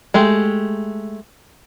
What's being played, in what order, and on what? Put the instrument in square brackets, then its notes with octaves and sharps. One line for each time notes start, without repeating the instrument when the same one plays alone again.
[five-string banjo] G#3 A3 G4